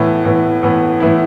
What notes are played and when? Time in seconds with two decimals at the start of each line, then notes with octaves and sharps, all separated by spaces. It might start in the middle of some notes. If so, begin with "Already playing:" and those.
Already playing: A2 E3 B3 E4
0.25 A2 E3 B3 E4
0.63 A2 E3 B3 E4
1.00 A2 E3 B3 E4